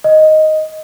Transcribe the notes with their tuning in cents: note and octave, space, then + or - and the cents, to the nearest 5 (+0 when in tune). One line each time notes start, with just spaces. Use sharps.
D#5 +0